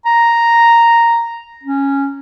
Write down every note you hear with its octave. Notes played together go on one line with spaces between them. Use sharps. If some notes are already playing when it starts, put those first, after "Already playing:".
A#5
C#4